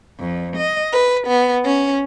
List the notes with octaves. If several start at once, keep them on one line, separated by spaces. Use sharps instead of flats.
F2
D#5
B4
B3
C#4